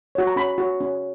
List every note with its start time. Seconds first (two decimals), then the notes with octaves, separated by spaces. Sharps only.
0.15 F#4 C#5
0.27 A#5
0.36 C#4 B5
0.58 F#4 C#5
0.80 C#4